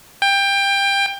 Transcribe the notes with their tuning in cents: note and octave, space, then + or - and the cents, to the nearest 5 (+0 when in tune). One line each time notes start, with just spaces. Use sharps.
G5 +20